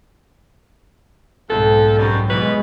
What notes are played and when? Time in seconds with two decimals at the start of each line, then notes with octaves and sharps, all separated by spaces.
1.49 B1 F2 G#2 A4
1.98 F#2 G3
2.29 B2 E3 F#3 G#3 B4